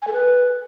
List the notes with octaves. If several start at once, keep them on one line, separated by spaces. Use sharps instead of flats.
G#5
A4
B4